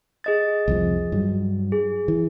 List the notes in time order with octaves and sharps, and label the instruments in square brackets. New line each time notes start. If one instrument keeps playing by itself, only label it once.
[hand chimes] G#4 D#5 A6
[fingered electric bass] C2 F2 F3
G2 F#3
[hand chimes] G#4
[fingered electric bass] E3